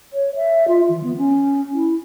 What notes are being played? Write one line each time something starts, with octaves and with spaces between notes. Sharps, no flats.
C#5
E5
F4
E3
B3
C#4
E4